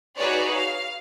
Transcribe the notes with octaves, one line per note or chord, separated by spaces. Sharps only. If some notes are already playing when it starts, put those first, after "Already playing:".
D#4 F#4 G#4 B4 C#5 D5
F5